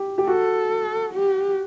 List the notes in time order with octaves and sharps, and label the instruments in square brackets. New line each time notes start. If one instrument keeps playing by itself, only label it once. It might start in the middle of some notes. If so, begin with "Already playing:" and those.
Already playing: [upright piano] G4
G4
[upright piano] F#4 [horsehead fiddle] A4
[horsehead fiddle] G4